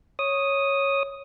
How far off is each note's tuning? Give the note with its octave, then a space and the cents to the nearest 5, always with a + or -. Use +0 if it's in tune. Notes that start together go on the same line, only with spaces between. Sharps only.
C#5 -5 D#6 +0